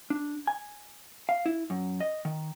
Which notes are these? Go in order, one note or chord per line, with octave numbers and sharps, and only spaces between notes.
D4
G#5
F5
E4
F#2
D#5
D#3